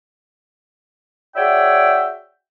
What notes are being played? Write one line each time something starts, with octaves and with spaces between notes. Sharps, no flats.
F#4 G#4 C#5 D5 E5 G5